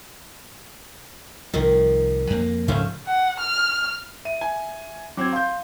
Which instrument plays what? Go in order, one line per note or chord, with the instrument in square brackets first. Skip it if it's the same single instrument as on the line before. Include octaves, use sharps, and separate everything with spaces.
[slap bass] C2 F3 [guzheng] D#3
[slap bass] F2 A#3
[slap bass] D2 G#2 C#3 [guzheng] F3 A3 C#4
[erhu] F#5
F6
[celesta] E5 [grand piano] D#7
[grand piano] G#5
[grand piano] F#3 C4 [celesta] D6 G#6
[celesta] F5 [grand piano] C6 G6